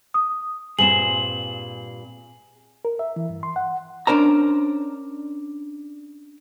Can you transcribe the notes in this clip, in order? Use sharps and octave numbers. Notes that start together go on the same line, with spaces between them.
D#6
G2 A#2 C4 G#4 E7 F#7
A#4
E5
E3
G2
C6
F#5
C#4 D4 A#4 C5 A#5